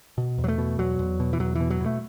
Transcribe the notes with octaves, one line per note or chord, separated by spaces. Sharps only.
B2
E2
F#3
A3
B2
E2 F#3
E2
B2
E3
E2 F#3
B2 E3
F#3
B2
A3